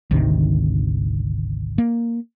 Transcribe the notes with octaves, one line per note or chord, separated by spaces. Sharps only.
G#1 D2 C3 D#3
A#3